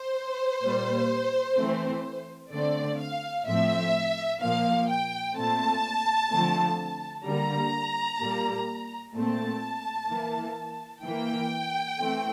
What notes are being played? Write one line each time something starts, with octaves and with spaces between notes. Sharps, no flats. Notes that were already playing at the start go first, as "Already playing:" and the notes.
Already playing: C5
A#2 G3 A#3
E3 A3 C4
D3 A3 C4 D5
F5
A2 F3 A3 C4 E5
A#2 F3 A#3 F5
G5
A#2 A3 C4 A5
D3 F3 A3 C4
D3 G3 A#3 A#5
A#2 G3 A#3
A#2 A3 C4 A5
E3 A#3
E3 A#3 G5
E3 A3 C4